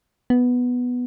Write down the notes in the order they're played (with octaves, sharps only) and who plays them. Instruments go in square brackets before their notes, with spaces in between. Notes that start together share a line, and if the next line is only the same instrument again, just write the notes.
[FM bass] B3